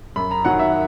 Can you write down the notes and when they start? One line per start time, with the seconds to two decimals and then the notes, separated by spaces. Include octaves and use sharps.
0.16 F#2 B5
0.31 A#5
0.45 D#3 F#3 F#5
0.59 E5